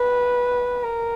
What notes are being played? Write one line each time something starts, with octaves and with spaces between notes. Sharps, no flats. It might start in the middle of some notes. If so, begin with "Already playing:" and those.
Already playing: B4
A#4